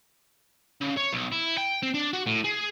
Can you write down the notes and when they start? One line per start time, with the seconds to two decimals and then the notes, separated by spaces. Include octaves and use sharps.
0.81 C#3
0.97 C#5
1.13 B1
1.32 E4
1.58 G5
1.83 C4
1.94 D4
2.13 F#4
2.27 A2
2.44 G#4